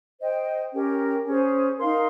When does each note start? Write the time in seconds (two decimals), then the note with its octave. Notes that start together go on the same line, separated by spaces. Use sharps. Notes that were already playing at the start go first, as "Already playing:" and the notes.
0.20 C5 D#5 G5
0.72 C#4 G4 A#4
1.25 C#4 G#4 C5
1.78 D#4 A#4 F5 C6